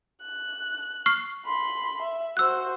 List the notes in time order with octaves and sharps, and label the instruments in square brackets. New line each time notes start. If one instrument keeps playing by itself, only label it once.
[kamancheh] F#6
[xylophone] C#6 F6 C7
[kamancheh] B5 C6
E5
[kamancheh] F#4 C5 [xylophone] E6 F#6